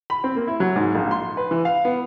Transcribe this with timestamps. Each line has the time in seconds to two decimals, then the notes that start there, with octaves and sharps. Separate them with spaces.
0.10 B5
0.24 C4
0.36 A#3
0.48 E4
0.60 F#3
0.76 G#2
0.95 A#1
1.11 C6
1.37 B4
1.51 E3
1.65 F5
1.85 B3